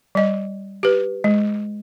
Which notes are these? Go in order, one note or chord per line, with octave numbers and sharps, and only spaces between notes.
G3 D#5
G4 B4
G#3